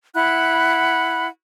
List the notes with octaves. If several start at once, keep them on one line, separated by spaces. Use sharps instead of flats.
E4 F#5 B5 F#6